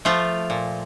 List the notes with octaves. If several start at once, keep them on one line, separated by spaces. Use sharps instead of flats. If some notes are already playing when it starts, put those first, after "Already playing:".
F3 A3 F4
A#2